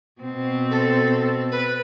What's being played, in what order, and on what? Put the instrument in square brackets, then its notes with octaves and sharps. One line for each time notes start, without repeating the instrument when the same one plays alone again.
[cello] B2 C4
[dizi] A4
B4